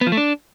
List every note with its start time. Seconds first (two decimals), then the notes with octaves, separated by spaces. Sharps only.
0.01 B3
0.07 F3
0.12 A3
0.17 D4